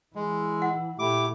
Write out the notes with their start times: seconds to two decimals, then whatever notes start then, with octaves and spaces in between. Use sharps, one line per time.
0.15 E3 G#3 E4
0.62 F#5
0.99 A#2 A3 E4 G4 D6